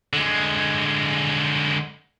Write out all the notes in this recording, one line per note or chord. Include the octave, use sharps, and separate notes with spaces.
D3 G#3